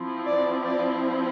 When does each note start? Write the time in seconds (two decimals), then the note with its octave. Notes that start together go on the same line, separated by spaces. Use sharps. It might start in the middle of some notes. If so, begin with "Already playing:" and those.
Already playing: F3 C4 E4
0.26 D5
0.65 D5